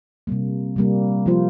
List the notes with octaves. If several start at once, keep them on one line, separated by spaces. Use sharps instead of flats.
C3 G3 A#3
C3 G3 A#3
F3 A#3 F4 C5